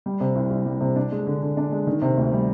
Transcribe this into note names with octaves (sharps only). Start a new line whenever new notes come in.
G3
C3
C2
C2
G3
C3
D4
G#3
D3
D3
D4
G#3
D#3
C3
D2
G3